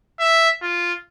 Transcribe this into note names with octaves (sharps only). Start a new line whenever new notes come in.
E5
F4